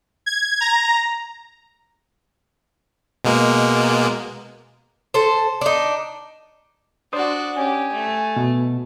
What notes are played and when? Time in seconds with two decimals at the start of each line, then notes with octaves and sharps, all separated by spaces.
0.26 G#6
0.61 A#5
3.25 B2 G#3 A#3
5.14 A4 C5
5.61 D4 D#4
7.13 D4 F#4 C5 D5 D#6
7.57 C#4 G4 G#5
7.93 A3
8.37 B2